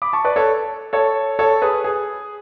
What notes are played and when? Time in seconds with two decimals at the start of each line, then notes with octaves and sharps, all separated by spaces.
0.02 B5 D6
0.13 A5 C#6
0.24 B4 D5
0.36 A4 C#5
0.93 A4 C#5
1.39 A4 C#5
1.62 G#4 B4
1.84 G#4